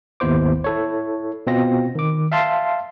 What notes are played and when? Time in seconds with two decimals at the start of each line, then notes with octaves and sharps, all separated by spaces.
0.20 G#1 D#2 B3 E4 C5 D6
0.64 E4 A4 C#5
1.47 B2 C4 F4 A#6
1.95 D#3 D6
2.32 E5 F5 A5 C6